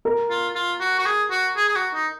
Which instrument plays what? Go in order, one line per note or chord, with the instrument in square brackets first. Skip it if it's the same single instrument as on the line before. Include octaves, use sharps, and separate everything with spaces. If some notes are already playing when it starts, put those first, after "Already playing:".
[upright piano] A#4
[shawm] F4
F4
F#4
F#4
G#4
F#4
G#4
G#4
F#4
D#4